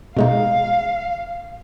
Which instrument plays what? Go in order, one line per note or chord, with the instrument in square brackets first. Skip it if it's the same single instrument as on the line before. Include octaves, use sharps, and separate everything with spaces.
[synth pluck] B2 G#3 D#4 [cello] F5